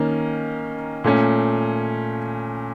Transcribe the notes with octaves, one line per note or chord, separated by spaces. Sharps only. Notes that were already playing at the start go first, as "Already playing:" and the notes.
Already playing: D#3 A#3 C#4
A#2 A3 C#4